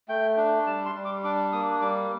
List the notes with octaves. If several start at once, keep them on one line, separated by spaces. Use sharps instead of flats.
A3 G5
D4
G3 A5
C6
G3
D6
D4 D6
A#3 D#6
G3 D6